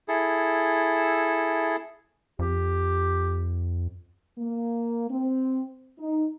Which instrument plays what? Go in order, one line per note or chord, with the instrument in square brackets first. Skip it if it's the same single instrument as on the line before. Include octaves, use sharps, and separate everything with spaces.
[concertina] E4 G#4 A4
[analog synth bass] F2 [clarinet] G4
[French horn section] A#3
C4
D#4